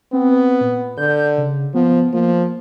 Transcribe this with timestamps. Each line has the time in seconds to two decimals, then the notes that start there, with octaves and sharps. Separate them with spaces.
0.13 B3 C4
0.61 A#2
0.98 D3 G6
1.38 C#3
1.75 F3 B3
2.13 F3 A#3